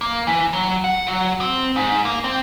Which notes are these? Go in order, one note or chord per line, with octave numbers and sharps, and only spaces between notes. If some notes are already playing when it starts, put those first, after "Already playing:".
A#3
E3
F#3
F#5
F#3
C4
G#2
A#3
C4